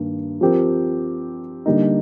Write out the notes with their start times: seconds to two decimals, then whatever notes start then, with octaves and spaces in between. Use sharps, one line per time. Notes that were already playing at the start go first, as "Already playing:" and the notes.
Already playing: G2 D#3 A#3
0.41 F3 C4 G4 A#4
1.66 D3 G3 A#3 D#4